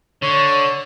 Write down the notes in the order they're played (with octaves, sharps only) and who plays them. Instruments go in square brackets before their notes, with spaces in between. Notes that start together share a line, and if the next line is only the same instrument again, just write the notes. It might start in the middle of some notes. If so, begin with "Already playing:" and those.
[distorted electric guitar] D3 [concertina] C#5